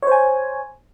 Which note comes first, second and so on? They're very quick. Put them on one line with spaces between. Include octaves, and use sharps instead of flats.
C#5 C5 G#5